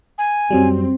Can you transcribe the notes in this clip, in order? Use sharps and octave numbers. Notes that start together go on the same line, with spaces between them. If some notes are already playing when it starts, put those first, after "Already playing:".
G#5
F#2 F#3 G3 C4